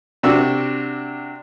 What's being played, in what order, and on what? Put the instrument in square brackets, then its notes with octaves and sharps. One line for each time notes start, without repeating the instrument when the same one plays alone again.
[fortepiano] C3 D4 F#4 E6